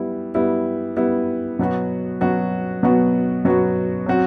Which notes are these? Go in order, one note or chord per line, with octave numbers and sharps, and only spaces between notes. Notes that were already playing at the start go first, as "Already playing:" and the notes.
Already playing: G3 B3 E4
G3 B3 E4
G3 B3 E4
B2 F#3 B3 F#4
B2 F#3 B3 F#4
B2 F#3 B3 F#4
B2 F#3 B3 F#4
F#3 C4 F#4